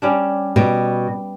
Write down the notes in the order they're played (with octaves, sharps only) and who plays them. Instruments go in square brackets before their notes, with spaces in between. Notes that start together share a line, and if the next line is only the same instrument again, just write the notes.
[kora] G3 C#4 D4
[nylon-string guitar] B2 [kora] G3